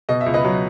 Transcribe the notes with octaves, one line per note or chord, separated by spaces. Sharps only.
B2 D#5
E5
C#2
B4 D#5
F#3